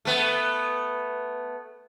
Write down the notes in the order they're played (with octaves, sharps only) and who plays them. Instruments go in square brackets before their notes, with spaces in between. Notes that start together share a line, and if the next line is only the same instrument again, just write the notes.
[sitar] A3 B3